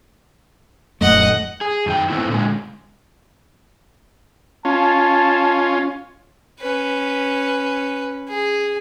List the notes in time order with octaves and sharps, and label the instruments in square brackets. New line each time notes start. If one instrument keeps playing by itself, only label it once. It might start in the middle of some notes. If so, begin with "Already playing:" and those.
[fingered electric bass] D#1 F#2 A3 [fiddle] D#5 F#5
[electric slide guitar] G#4
F#2 D#3 G5
A3 B3 C4 E4
A#2 D3 G#3
[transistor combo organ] C#4 F4 [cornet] A5
[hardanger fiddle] C#4 B4
G#4